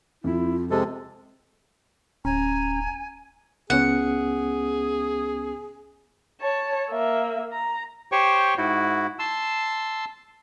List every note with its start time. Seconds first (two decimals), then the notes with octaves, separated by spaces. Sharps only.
0.24 F2 E4 F4
0.71 C3 G#3 C4 A4
2.25 D1 C#4 G#5 A#5
3.70 C#2 B3 C#4 G#4 F#5
6.41 C#5 A5
6.90 A#3 E5
7.53 A#5
8.12 G4 C5 C#5 G5 C#6
8.58 G#2 E4 F#4
9.19 A5 C6 E6